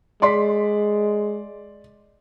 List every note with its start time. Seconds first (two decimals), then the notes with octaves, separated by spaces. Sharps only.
0.22 G#3 D5 C6 B6